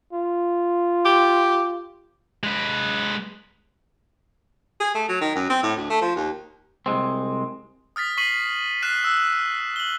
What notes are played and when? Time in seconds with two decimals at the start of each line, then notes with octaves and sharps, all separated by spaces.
0.13 F4
1.05 G4
2.43 G#3 B4
4.80 G#4
4.95 A3
5.09 F#3
5.21 D#3
5.35 F#2
5.50 C4
5.63 A2
5.76 D2
5.90 A3
6.01 F3
6.16 D#2
6.86 C2 F2 G#3 C4
7.96 D#6 F6 A6 B6
8.17 C#6 B6 C7 D#7 F#7
8.82 F6 F#6 B6 C7 E7
9.03 E6 F#6
9.76 F#7 G7